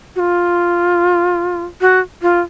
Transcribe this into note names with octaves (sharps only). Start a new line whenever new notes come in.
F#4
F4
F#4
F4